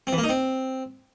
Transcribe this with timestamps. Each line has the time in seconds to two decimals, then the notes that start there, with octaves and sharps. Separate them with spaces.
0.07 C4
0.13 E3
0.18 A#3
0.24 D#4
0.29 C4